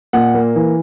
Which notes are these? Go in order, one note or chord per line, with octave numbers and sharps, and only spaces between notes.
A#2 F#5
A#3
E3